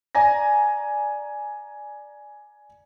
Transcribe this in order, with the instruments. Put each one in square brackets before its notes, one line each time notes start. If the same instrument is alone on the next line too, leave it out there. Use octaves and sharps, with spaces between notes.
[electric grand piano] D5 G#5 A#5 A#6